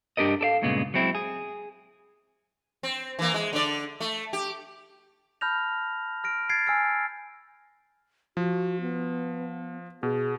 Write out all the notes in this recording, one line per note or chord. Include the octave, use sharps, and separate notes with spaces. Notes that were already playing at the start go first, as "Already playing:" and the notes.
G2 D4 G4 A#4 D#5
A4 D5 F5
G2 A#2 C#3 G#3 B3
F#3 G#3 C4 E4
G#4
C4
E3 A#3
G#3
D3 D5
A3
G4
A5 B5 F6 G6 A#6 F7
F6 A#6 D7
G#6 A6 C7 D7
G#5 E6 F6 D7
F3 F#4
B3
B2 G#4